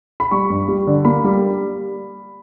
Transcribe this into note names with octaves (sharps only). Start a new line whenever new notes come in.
B5
G3 C#6
G2
G3
D3
A#3 B5
G3